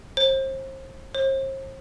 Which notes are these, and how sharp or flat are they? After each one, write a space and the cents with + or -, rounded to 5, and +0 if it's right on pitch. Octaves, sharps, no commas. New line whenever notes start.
C5 +35
C5 +40